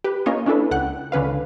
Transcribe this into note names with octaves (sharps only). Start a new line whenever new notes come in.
G4 B4
A#3 C#4 F4 C#5 D#5
C#4 D4 E4 A4 B4
C#2 F#5 G5 F#6
C#2 D3 C#4 B4 F5